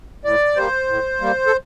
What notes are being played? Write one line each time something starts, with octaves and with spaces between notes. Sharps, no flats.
A2 D5
G3 A#3 C5
A2
G3 A#3
A4